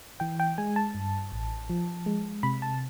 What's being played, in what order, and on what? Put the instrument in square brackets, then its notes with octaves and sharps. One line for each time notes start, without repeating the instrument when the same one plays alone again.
[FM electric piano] E3 G5
G5
G#3 G#5
A5
G2
A1
F3
G#3
C3 B5
A5